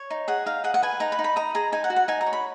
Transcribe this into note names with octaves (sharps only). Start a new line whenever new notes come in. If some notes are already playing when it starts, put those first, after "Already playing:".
Already playing: C#5
D#4
G#4 F#5
D#4 F5
G#4 F#5
F#5
B4 G#5
D#4 A#5
B5
D#4
B5
D#5 A#5
G#4 A#5
D#4 G#5
F#5
F#4
F#5
D#4 G#5
A#5
C#5
B5